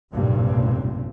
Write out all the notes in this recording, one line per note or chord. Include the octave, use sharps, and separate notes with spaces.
F1 B1 G2 A#2 C4